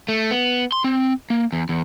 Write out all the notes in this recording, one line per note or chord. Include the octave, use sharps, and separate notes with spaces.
A3
B3
C6
C4
A#3
E2
E2